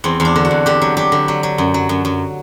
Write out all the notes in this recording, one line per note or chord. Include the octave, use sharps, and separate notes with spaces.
E2 C4
E2
D4
D3
F#4
E2
D3 G4
F#3
F#3 G4
D3
F#3
F#3
F#2
F#3
F#2
F#2